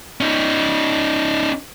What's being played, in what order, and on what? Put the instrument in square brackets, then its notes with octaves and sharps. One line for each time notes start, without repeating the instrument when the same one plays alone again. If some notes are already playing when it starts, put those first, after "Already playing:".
[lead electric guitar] C#4 D#4